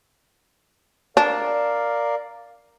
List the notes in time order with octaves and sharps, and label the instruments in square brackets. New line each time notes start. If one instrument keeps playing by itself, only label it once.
[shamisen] D4 [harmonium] A#4 D5 F5